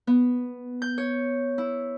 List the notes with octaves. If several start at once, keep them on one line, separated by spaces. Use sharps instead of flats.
B3
G6
C#5
E4